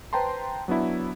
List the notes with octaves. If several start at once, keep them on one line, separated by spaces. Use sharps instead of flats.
B4 C5 G5 A5 A#5 C6
F#3 B3 D4 E4